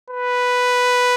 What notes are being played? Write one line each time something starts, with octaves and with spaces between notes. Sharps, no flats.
B4